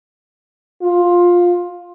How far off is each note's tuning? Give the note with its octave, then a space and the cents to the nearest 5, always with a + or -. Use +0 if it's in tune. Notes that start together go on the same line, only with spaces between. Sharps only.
F4 +10